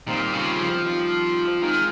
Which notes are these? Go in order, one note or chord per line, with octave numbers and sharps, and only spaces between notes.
A#2 D#3 G3 C4 F4 C5
C#3
F3
D#3 G3 C4 F4 C5
D#3 G#3 C4 F4